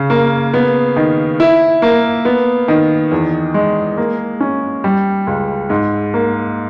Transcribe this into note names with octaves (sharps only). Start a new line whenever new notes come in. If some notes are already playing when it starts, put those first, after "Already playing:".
Already playing: C#3
A#3
B3
D#3
E4
A#3
B3
D#3
E2
G#3
A#3
C#4
G3
C#2
G#2
A#3